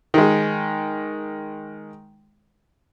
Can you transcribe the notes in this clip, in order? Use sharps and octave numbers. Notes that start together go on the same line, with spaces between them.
D#3 G#3